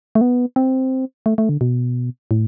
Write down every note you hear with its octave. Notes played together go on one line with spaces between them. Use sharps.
A3
B3
C4
A3
A3
D3
B2
A2